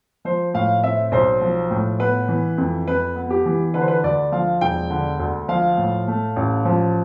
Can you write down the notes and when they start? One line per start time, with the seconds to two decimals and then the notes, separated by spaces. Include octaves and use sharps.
0.25 F3 C5
0.54 A2 F5
0.83 C4 E5
1.12 B1 C5
1.41 F3
1.71 A2
1.99 B3 B4
2.28 E3
2.58 F2
2.87 F2 B4
3.16 B3
3.30 G4
3.46 E3
3.74 D3 B4
3.81 C5
3.88 B4
4.03 D2 D5
4.32 F3 F5
4.61 E1 G5
4.90 D3
5.19 D2
5.48 F3 F5
5.77 A2
6.08 A3
6.36 A1
6.65 F3